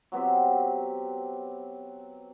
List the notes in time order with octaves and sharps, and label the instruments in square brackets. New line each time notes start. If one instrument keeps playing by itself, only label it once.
[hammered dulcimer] F#3 B3 C4 G4